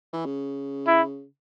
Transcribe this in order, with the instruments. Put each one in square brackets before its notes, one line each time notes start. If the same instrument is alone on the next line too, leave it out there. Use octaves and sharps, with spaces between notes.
[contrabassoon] E3
C#3
[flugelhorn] E4